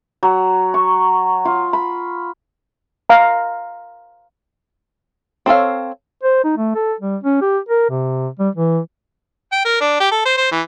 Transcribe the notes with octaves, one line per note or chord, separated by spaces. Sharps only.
F#3
C#6
F4
B5
F5 A#5
C4 A4 C#5 F5
C5
D#4
A3
A4
G3
C#4
G4
A#4
C3
G3
E3
G5
A#4
D4
G4
A4
C5
C5
E3